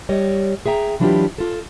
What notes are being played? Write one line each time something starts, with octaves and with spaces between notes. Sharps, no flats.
G3 C#5 D#5
G#4 E5 G5 A#5
E3 F#3 D4 E4 F4 G4
F4 A4